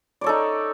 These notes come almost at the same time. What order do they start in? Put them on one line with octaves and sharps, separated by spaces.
D5 C#5 A4 D#4